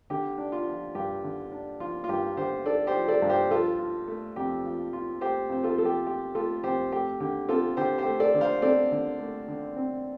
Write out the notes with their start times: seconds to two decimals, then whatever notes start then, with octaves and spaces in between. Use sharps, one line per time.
0.10 D3 G4
0.38 D4
0.52 F4
0.67 F3
0.95 G2 G4
1.24 D3
1.52 D4
1.80 F3 F4
2.04 F4
2.09 G2 G4
2.37 D3 G4 C5
2.65 D4 A4 D5
2.87 G4 C5
2.94 F3
3.08 A4 D5
3.22 G2
3.29 G4 C5
3.51 F3 F4 A4
3.79 F4
4.08 A3
4.36 F2 G4
4.64 F3
4.93 F4
5.21 A3 G4 C5
5.50 F2 C5
5.64 F4 A4
5.78 F3 A4
5.85 G4
6.07 F4 G4
6.35 A3 F4 A4
6.64 F2 G4 C5
6.92 A3 G4
7.20 D3 G4
7.49 C4 F4 A4
7.77 D3 G4 C5
7.98 G4 C5
8.06 A3
8.20 A4 D5
8.34 D3
8.41 C5 F5
8.62 C4 A4 D5
8.91 D3
9.19 A3
9.48 D3
9.76 C4